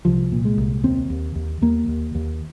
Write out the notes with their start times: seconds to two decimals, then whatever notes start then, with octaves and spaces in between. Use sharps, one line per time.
0.05 C2 F3
0.32 A#2
0.45 G#3
0.57 C2
0.84 D#2 C4
1.10 D#2
1.35 D#2
1.61 D#2 A#3
1.88 D#2
2.15 D#2